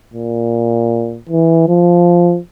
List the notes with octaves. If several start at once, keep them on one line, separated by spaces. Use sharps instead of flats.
A#2
E3
F3